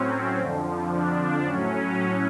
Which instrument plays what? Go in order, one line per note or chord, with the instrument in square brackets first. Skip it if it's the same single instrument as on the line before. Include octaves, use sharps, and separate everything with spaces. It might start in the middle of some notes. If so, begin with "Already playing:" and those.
Already playing: [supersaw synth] A2 F#3 C4 C#4
F2 D3 F3
D4
A2 F#3 C#4